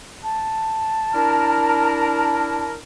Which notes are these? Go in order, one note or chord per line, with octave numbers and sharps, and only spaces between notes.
A5
D4 E4 A#4